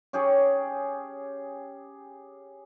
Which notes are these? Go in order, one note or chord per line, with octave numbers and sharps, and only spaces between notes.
C#4 G4 G#4 C#5